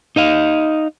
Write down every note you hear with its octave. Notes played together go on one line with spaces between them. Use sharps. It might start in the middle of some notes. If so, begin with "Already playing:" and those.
D#4 D#5 F5